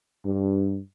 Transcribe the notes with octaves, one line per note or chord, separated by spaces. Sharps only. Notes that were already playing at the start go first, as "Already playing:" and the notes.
G2